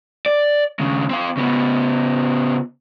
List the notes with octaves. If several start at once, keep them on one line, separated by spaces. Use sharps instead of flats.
D5
D#2 C#3
C4 F5
C#3 B3